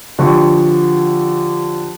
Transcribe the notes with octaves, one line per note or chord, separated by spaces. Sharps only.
D3 F3 G4 C#6